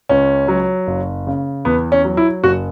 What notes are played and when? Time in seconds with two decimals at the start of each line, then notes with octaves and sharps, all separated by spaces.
0.09 C#2 C#4
0.48 F#3
0.87 F#1
1.27 C#3
1.65 E2 B3
1.92 C#4
2.05 F#3
2.17 E4
2.43 F#1 F#4